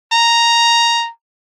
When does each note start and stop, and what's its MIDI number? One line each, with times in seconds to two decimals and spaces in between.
0.13 1.09 82